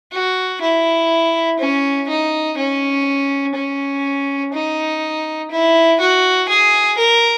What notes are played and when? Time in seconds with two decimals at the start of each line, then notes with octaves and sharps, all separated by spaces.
0.12 F#4
0.61 E4
1.59 C#4
2.08 D#4
2.57 C#4
3.55 C#4
4.53 D#4
5.51 E4
6.00 F#4
6.49 G#4
6.98 A#4